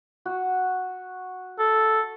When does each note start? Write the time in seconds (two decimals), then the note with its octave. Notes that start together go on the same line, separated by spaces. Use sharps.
0.25 F#4
1.59 A4